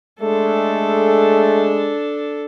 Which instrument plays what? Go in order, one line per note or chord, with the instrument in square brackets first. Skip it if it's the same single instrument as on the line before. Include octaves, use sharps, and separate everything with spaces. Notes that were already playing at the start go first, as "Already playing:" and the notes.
[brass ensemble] G#3 [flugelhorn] A3 [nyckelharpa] D4 A4